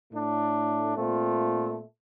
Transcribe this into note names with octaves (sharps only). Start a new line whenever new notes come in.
A2 A3 D4
A#2 A3 C4 F4